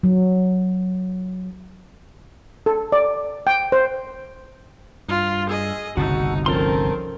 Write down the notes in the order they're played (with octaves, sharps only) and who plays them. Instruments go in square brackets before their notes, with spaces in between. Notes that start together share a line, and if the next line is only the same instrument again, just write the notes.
[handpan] F#3
[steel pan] A4
D5
G5
C5
[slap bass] G2 [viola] F4
[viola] G#4 D#5 [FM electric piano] E6
[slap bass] G1 C2 [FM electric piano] C#3 A5 E6 [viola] D#4 [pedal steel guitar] F#4
[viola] D#3 C4 [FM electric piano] F3 C#4 [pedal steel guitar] A4 A#4 C6